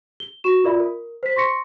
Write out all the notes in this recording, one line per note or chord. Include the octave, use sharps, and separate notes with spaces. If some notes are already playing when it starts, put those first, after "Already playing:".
G7
F#4 C#6 E7
F4 A#4 D5 E5 B5
A#4
C5 B6
C6 C#6 A#6 C#7